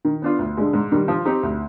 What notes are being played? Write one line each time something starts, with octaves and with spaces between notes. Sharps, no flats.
D#3
B3 D4 F4
D2
D3 G#3
G#2
D#3 G3
F3
C4 D#4 G4
D2